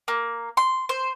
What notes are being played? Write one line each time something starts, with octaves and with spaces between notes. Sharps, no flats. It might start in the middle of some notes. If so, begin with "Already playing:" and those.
A#3
C6
C5